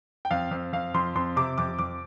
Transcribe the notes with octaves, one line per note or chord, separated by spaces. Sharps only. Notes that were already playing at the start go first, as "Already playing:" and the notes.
G5
F2 F5
F2
F2 F5
F2 C6
F2 C6
C3 D6
F2 D6
F2 D6